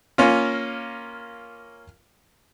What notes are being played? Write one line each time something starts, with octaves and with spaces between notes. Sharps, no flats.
A#3 C#4 F4